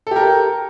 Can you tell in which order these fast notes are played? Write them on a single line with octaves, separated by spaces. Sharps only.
A4 G4 A#4